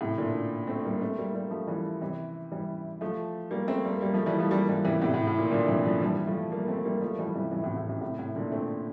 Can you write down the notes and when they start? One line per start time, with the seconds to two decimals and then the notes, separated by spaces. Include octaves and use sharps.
0.01 A2 C3
0.17 A#2 D3
0.67 A3 C4
0.85 G3 A#3
1.01 A3 C4
1.18 G3 A#3
1.34 G3 A#3
1.51 F3 A3
1.67 E3 G3
2.01 C3 E3
2.52 E3 G3
3.01 F3 A3
3.51 G3 A#3
3.68 A3 C4
3.85 G3 A#3
4.01 G3 A#3
4.14 F3 A3
4.26 E3 G3
4.39 F3 A3
4.51 G3 A#3
4.69 E3 G3
4.85 C3 E3
5.02 A2 C3
5.14 A2
5.27 A2
5.39 A#2
5.51 A#2 D3
5.68 C3 E3
5.84 D3 F3
6.02 E3 G3
6.27 F3 A3
6.52 G3 A#3
6.68 A3 C4
6.85 G3 A#3
7.02 F3 A3
7.19 E3 G3
7.35 C3 E3
7.51 C3 E3
7.64 A2 C3
7.77 A2
7.89 A2 C3
8.01 A2 C3
8.18 A2 C3
8.35 A#2 D3
8.51 A3 C4